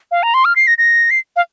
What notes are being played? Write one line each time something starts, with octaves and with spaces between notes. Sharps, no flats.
F5
A#5
C6
F6
C7
A#6
A#6
C7
F5